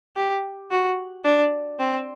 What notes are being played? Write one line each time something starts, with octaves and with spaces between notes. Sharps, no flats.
G4
F#4
D4
C4